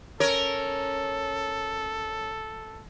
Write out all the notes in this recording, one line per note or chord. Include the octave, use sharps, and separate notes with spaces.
C#4 A4 A#4 C#5